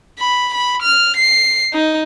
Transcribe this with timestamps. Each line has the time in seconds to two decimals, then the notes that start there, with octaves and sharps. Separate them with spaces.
0.19 B5
0.54 B5
0.83 F6
1.17 C7
1.73 D#4